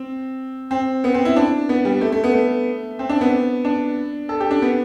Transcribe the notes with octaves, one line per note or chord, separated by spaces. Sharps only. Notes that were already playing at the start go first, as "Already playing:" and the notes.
Already playing: C4
C4
B3
C4
E4
D4
B3
G3
A3
A3
B3
A3
C4
D4
B3
D4
A4
G4
D4
B3